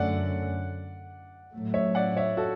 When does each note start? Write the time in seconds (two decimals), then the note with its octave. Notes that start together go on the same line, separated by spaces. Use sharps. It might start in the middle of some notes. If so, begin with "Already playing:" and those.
Already playing: F#2 D3 A3 C#4 D5 F#5
1.53 A2 F#3 A3
1.74 C#5 E5
1.95 D5 F#5
2.17 C#5 E5
2.37 F#4 A4